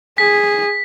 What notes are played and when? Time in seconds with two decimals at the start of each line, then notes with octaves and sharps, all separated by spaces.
0.18 G#4 B6